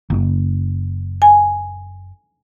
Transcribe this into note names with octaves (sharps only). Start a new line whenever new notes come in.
F#1
G#5